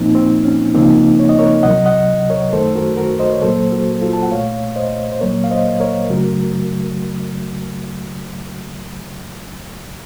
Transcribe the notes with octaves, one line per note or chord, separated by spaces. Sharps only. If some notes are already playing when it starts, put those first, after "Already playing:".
Already playing: A#2 F3 A#3 C4 D#4
C4
C#4
C#2 C#3 F3 A#3 C4 D#4
C#5
D#5
A#4 C#5
C2 C3 F#3 D#5 F#5
D#5 F#5
A#4 C#5
F#2 D#3 A3 A4 C5
F#4 A#4
F#4 A#4
C5 D#5
C#5
A#2 F#3 A#3 A4 C5
F#4 A#4
F4 A4
A5
F#5
C2 A#2 A3 C#5 F5
C5 D#5
C5
A#2 F#3 A#3 A#4 C#5
F5
C5 D#5
A#4 C#5
F#2 C#3 F#3 A3 F#4 A#4